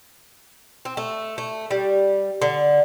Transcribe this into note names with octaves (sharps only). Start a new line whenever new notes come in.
C4
A3
A3
G3
D3